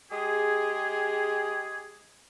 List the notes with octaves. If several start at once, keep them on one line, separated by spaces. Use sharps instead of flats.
G#3 G4 G#4